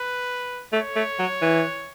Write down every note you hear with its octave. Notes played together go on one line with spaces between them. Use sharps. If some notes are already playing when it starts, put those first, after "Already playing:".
Already playing: B4
A3 C#5
A3
F#3
E3